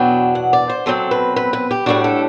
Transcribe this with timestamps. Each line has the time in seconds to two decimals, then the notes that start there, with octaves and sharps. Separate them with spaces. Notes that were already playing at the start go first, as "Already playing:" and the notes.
Already playing: E2 B2 F#3 B3 D4 G5
0.35 F#5
0.53 D5
0.70 C5
0.86 B2 F#3 C4 A4
1.11 B4
1.36 B4
1.53 B4
1.71 G4
1.86 A2 G3 D4 F#4
2.04 A4